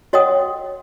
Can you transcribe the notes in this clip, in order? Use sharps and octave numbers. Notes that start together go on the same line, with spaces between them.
F#4 C#5 D#5 F#5 G5 D#6